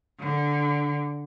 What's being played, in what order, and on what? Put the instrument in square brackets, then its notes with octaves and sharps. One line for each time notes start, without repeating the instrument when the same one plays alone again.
[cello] D3